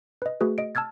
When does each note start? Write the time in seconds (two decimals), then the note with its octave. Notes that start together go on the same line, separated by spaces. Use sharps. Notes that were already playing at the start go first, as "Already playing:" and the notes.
0.22 B4 D#5
0.41 A3 F#4 G#4 B4
0.58 D#5 D7
0.75 A5 E6 F6 G#6 A6